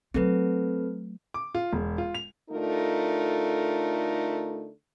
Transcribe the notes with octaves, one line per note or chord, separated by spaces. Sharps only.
F#3 A3 C4 A4 B4
D6
F4
E1
F4
F7
D3 A3 D#4 F4 A#4